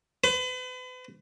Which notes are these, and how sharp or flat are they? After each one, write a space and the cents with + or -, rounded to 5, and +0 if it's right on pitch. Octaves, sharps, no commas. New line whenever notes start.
B4 +40